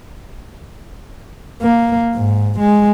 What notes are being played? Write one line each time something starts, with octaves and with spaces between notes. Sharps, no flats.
A#3
G#2
G#3